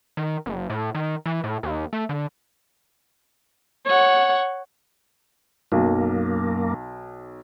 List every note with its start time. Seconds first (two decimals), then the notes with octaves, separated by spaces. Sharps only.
0.17 D#3
0.46 F#1
0.70 A2
0.95 D#3
1.26 E3
1.44 A2
1.63 D#2
1.93 A3
2.09 D3
3.87 C#5 F#5
5.72 B1 F#2 A#3